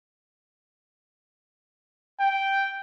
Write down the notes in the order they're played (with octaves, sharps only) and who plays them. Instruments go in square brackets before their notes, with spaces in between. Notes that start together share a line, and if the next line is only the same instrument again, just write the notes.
[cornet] G5